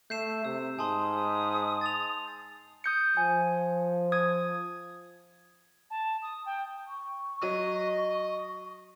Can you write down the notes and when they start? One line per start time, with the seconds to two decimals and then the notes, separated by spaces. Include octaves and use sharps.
0.10 A3 G6 C7 E7
0.45 C3 E6 G6
0.79 G#2 G#5 A5 C6 D#6
1.13 D#6
1.81 A6 F7
2.84 D#6 G6 C#7
3.17 F3 G#5
4.12 D#6 G#6
5.90 A5
6.22 D#6
6.46 G5
6.88 C#6
7.43 F#3 D#5